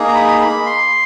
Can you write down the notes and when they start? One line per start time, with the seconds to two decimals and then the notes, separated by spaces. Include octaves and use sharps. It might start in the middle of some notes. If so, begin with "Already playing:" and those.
Already playing: A#3 D#4 G#4
0.08 A#5
0.15 B5
0.41 B5
0.66 C6